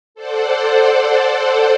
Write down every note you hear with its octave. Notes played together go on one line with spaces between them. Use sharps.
A4 C5 D5 F#5